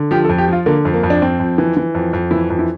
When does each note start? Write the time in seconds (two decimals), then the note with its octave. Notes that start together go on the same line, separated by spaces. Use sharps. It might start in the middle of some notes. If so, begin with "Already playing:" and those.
Already playing: D3
0.11 F3 G4
0.25 A4
0.29 F2
0.38 G4
0.48 F3 F4
0.66 D3 A#3
0.85 F2
0.93 A#3
1.03 F2
1.10 D4
1.22 F2 C4
1.40 F2
1.58 E3
1.77 E3
1.95 F2
2.13 F2
2.31 E3 E4
2.50 F2
2.59 E4